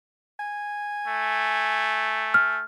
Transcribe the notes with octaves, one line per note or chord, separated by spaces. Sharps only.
G#5
A3
F6